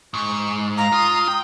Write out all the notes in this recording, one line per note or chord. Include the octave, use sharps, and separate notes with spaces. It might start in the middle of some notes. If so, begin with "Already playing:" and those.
G#2 C#6
F5 A#5
F4 D#6
G5